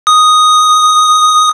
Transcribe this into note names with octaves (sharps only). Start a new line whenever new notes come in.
D#6